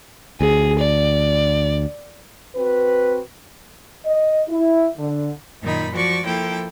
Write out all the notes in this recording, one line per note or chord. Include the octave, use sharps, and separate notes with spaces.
D2 G#4
D5
C4 F#4 B4
D#5
E4
D3
F#2 A#2 D#3 D#4 B5
F3 F#4 D5 C#6
F3 A#3 E4 A4 G5